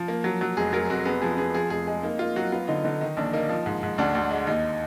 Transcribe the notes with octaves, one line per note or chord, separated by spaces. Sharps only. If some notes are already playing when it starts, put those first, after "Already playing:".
Already playing: F3
A#3
F#3
F#3
F1 G#4
F#3 A#4
F1 F#4
B3 G#4
F3 G#4
B3 G#4
F3 G#4
F1 G#4
G#3 G#4
A#3 D#4
A#3 F4
F#3 F#4
B3 F4
D3 D#4
D3 D#4
D#3 D#4
A#1 D4
A#3 D#4
F3
G#2
G#2
D2 D4
D2
G#3
D#2 D#4